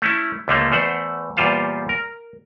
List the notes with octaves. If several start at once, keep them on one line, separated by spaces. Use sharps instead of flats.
A3 C#4 E4
C#2 D3 F3 A3 A#3
E2 A3 C5 F#5
E2 A#2 G3 F4 C5 F5
A#4